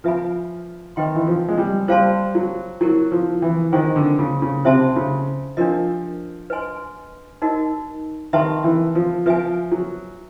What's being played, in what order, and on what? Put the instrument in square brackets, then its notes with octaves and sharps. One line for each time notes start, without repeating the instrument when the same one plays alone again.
[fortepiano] F3 [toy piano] B4 E5 G#5 B5
[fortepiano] D#3 [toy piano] B4 D#5 G5 C6
[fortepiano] E3
F3
G#3
G3
[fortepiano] G3 [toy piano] C5 F5 A5 C6
[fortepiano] F#3
[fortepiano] F#3 [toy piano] E4 G4 A#4
[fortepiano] F3
E3
[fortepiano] D#3 [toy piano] D4 F4 G#4 C5 D#5
[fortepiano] D3
C#3
C#3
[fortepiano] C3 [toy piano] C5 E5 A5 C6
[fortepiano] C#3
[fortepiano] F3 [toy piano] D4 G4 A#4 D#5
[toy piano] B4 D#5 G#5 C6
D#4 F#4 A#4 D#5
[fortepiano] D#3 [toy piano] G4 B4 E5 A5 C6
[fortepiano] E3
F3
[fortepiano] F3 [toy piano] B4 E5 G#5
[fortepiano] F#3